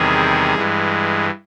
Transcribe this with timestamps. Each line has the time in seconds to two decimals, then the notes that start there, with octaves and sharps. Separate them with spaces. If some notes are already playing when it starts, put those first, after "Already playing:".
Already playing: E2 C3 D#3 G3 G#4
0.55 G2 E3 G#3